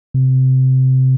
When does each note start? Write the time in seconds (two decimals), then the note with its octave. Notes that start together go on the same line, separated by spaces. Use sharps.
0.14 C3